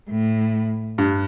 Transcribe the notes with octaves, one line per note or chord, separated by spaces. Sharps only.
A2
G2